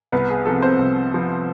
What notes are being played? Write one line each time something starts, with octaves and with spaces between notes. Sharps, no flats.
C2 B3 B4
G#4
C3 F3 B3 A4
C4 C5
C2
C3 F3 B3